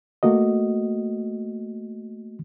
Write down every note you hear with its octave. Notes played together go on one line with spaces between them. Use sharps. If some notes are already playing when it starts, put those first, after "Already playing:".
A3 A#3 F#4 D#5